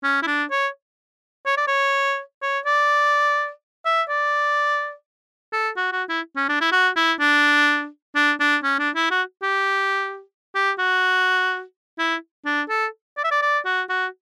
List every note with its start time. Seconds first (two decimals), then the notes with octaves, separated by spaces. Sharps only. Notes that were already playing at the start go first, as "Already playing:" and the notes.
0.04 C#4
0.23 E4
0.27 D4
0.51 C#5
1.46 C#5
1.58 D5
1.68 C#5
2.43 C#5
2.66 D5
3.86 E5
4.09 D5
5.53 A4
5.77 F#4
5.92 F#4
6.09 E4
6.36 C#4
6.49 D4
6.61 E4
6.72 F#4
6.96 E4
7.20 D4
8.16 D4
8.40 D4
8.63 C#4
8.79 D4
8.95 E4
9.11 F#4
9.43 G4
10.55 G4
10.79 F#4
11.99 E4
12.46 D4
12.70 A4
13.18 D5
13.24 E5
13.32 D5
13.42 D5
13.65 F#4
13.90 F#4